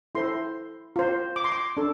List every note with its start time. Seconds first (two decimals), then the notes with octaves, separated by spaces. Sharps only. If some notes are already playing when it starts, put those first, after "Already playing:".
0.15 E4 A4 C5 C6
0.96 F4 C5
1.36 D6
1.44 C6
1.52 D6
1.77 D4 A4